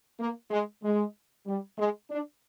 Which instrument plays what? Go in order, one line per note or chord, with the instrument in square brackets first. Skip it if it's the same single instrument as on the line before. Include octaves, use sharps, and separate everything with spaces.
[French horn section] A#3
G#3
G#3
G3
G#3
D4